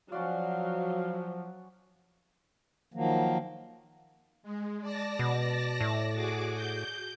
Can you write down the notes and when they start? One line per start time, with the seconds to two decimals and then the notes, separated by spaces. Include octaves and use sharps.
0.12 F3 F#3 C#4 F#4 D5 F5
2.94 D#3 F3 F#3 A#3
4.43 G#3
4.81 D5 A5 A#6
5.19 B2
5.81 A2
6.13 F#4 G#4 D6
6.54 G6